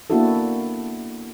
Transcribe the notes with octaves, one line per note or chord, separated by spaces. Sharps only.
A#3 B3 D4 E4 F#4 A4